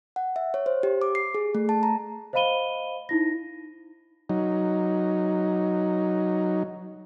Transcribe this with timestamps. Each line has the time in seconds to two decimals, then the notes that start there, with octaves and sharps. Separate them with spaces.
0.16 F#5
0.36 E5
0.54 C#5
0.66 C5
0.83 G4
1.02 D6
1.15 C7
1.35 G#4
1.55 A3
1.69 A5
1.83 A#5
2.33 C5 D#5 F5 B5 D#7 G7
3.09 D#4 E4 A#6
4.30 F#3 D#4